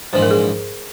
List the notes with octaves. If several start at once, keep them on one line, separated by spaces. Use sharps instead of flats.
A#1 G#2 E3 C5
A#4
G#4